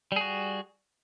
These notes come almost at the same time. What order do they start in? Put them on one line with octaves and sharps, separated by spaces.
G3 G#4 F#4